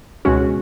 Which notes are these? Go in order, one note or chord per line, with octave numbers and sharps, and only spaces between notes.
C#2 B2 G#3 C#4 F#4